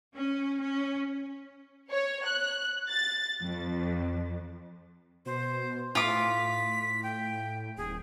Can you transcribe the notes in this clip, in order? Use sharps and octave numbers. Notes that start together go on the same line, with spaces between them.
C#4
C#4
C#5
F#6
A6
F2
B2 C5
A2 F4 D6 B6
G5
D#1 G#4